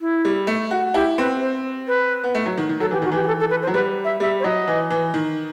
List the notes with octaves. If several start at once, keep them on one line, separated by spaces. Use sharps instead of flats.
E4
G3
A3
F#4
E4 G4
C4 B4
C5
B4
B3
A3
F#3
D#3
D#3
F#3 A4
E3 G4
D#3 F#4
E3 G4
G4
A4
A4
B4
C5
F#3
G3 B4
E5
G3 E5
C5
F#3 D#5
E3
E3
D#3